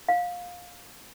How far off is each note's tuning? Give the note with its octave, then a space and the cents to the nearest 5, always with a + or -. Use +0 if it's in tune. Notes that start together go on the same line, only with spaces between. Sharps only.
F5 +20